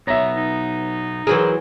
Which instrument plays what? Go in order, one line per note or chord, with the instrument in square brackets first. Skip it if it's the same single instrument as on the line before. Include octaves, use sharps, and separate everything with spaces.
[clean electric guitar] B1 B3 A#5 [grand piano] C#5 E5
[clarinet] D#4
[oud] E3 F#3 G#4 [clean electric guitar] A#4 C5